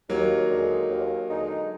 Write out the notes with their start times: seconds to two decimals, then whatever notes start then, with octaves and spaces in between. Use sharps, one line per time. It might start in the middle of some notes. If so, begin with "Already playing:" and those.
0.09 D#2 F#3 A#3
0.50 D3 G#3 D#4
0.89 D#2
1.29 D3 G#3 D#4